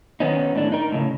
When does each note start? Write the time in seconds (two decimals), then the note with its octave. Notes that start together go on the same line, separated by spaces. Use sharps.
0.20 D#3 B3 C#4 D#4
0.55 A2 D4
0.72 D#4 A#4
0.92 A2 C#3